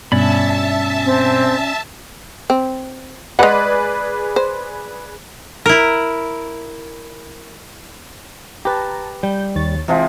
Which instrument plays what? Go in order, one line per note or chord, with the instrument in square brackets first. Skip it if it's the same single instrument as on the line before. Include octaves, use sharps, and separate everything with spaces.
[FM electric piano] G2 B2 [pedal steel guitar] C#4 D5 B5 [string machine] E5 A5
[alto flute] C4
[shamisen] C4
[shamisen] G#3 F#5 [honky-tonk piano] G#4 B4 D5
[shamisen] C5
[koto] E4 A#4
[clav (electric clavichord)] G4 B4 [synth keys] A5 A#5
[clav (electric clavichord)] G3 [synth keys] G6
[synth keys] D#2 C#5 A6
[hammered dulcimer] C3 F3 G#3 [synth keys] E3